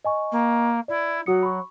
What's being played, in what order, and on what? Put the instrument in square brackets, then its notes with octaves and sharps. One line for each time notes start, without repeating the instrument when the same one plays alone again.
[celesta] D#5 G#5 C#6
[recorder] A#3
[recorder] E4 [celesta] D5
[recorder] F#3 [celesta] F#4 D#6 C#7
[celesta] B5 C#6